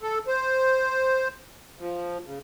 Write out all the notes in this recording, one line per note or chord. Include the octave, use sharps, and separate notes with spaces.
A4
C5
F3
C#3